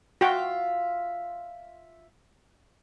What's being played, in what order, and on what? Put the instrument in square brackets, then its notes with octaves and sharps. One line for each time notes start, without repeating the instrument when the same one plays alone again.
[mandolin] F4 E5 F5 [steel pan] F#4 G5